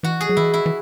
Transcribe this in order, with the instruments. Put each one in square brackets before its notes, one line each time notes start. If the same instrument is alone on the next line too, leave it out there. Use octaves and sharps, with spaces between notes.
[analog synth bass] E3 [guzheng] F#4
[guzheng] G#4
[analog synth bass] F#3
[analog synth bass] E3 [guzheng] E4
[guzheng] E4
[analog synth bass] E3